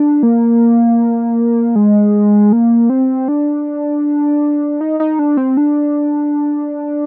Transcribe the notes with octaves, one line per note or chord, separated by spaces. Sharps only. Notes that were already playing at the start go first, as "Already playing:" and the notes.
Already playing: D4
A#3
G#3
A#3
C4
D4
D#4
D#4
D4
C4
D4